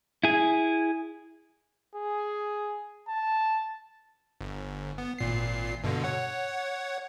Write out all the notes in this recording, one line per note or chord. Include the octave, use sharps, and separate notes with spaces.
E4 G#4
G#4
A5
G1
B3
G#1 A#2 C7
G2 B2 D3
C#5 F#5